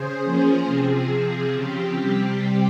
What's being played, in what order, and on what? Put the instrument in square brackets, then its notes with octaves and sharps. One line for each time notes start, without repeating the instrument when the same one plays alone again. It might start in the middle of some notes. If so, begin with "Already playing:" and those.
Already playing: [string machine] C#3 G#4 C5
F3 A#3 C#4
C3 F3 C4 G#4
C3 F3 C4
C#3 F3 C4 G4
C3 G3 C4